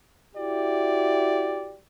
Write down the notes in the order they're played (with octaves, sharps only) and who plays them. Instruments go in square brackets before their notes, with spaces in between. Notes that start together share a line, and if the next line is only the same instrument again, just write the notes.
[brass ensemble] E4 F#4 G4 D5